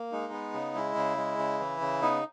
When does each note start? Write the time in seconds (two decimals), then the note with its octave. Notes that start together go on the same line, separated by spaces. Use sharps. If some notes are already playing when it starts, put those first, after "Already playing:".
Already playing: A#3
0.12 G#3 D#4
0.33 B3
0.54 C#3
0.75 G#3 E4
0.96 C#3
1.18 G#3
1.38 C#3
1.60 E3
1.81 C#3
2.02 B3 D#4